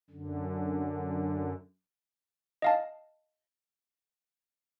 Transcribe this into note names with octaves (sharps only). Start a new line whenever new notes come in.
F#2 D3
D#5 F5 A5